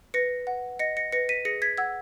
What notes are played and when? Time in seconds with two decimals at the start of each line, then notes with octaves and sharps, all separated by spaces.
0.14 B4 A#6 C#7
0.47 F#5
0.79 D#5 A#6 C#7
0.97 A#6 C#7
1.12 B4 A#6 C#7
1.29 B6 D#7
1.45 G#4 A#6 C#7
1.62 G#6 B6
1.78 F#5 E6 G#6